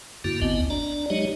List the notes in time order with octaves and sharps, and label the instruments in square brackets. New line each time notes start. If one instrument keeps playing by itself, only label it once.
[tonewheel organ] G2 D3 A#3 E4 F#4
G#1 D2 B3 C4 D#5
D4 D5 A#5
F#3 G#3 D#4 G4 C#5 D#5